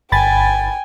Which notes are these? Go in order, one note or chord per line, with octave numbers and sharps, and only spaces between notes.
G1 G5 G#5 B5 A6